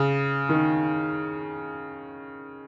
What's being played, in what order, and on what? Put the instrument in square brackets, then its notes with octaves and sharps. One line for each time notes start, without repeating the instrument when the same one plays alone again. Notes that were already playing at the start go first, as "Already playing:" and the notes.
Already playing: [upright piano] C#3
D#3